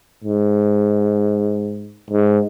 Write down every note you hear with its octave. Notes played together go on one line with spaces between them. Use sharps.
G#2
G#2